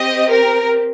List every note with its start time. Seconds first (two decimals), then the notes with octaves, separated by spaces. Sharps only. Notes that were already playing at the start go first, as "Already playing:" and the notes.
Already playing: C4 G4 D#5
0.31 A#4